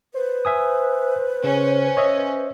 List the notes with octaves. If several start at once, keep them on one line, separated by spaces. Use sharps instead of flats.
B4 C5
E5 G#5 D#6
C#3 C#4
C#5 D#5 E5